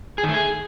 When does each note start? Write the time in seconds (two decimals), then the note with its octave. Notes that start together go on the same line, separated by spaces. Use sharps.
0.18 G#4
0.23 D#3
0.29 A3
0.34 G#4